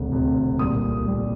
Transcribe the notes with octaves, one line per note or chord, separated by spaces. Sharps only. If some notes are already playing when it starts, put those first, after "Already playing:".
Already playing: E1 D2 C3
E1 D2 C3
C2 A#2 G3 D#6
C2 A#2 G3